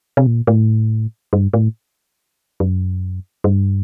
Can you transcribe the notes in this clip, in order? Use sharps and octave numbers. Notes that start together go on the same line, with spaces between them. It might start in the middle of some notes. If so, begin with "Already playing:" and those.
C3
A#2
A2
G2
A2
F#2
G2